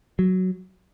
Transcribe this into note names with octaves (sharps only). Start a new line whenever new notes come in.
F#3